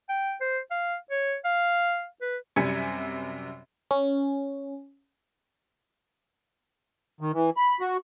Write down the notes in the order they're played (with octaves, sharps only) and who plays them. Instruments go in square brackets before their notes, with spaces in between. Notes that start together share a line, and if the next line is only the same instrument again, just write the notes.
[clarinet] G5
C5
F5
C#5
F5
B4
[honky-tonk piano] F#2 C3 G3 G#5 G#6 C#7
[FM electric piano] C#4
[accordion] D#3
E3
B5
F#4